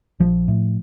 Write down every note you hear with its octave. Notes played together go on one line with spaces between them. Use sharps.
A#1 F3
A2